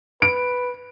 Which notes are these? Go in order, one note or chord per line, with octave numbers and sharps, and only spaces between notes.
B4 D7